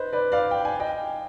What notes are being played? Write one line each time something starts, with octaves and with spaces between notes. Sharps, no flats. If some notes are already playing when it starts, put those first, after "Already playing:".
Already playing: B4 C5 D#5
B4 D5
D5 F5
G5
G#5
D#5 G5